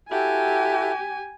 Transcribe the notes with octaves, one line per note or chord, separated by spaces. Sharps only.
E4 F#4 G4 A4 G#5